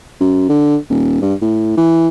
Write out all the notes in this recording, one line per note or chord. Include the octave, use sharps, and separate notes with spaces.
F#2
D3
D#1
G2
A2
E3